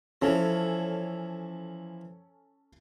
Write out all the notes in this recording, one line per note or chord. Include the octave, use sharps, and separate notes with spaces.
E3 F3 C#4 A4